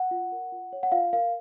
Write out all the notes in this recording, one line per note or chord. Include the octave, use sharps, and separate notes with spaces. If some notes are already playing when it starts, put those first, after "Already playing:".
Already playing: F#5
F4
A#4
F4
C#5
F#5
F4 F5
A#4 F5